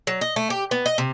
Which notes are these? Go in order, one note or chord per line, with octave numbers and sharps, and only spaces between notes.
F#3
D#5
A3
G4
B3
D#5
C3